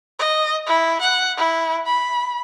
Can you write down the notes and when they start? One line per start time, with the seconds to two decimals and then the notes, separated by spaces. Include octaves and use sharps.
0.19 D#5
0.66 E4
1.01 F#5
1.37 E4
1.86 B5